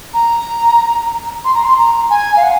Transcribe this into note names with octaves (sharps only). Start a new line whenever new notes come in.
A#5
C6
A#5
C6
A#5
G#5
F5
F#5